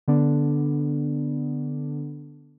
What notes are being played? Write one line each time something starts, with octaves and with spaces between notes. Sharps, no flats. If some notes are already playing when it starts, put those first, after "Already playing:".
D3 B3 D4